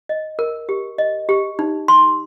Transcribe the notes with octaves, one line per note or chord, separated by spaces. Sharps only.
D#5
A#4
G4
D#5
G4
D#4
C6